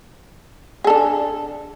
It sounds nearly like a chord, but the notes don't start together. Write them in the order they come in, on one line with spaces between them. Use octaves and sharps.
G#4 A4 D4